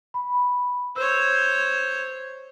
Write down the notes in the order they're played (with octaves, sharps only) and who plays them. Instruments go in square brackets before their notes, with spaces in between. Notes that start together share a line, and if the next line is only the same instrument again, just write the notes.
[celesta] B5
[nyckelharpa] C5 C#5 [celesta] E6